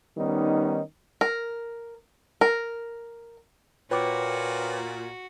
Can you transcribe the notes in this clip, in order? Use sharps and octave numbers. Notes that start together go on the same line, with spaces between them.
D#3 G3 B3 C#4 D#4
A#4
A#4
A#2 F#4 B4 C#5 G5 D6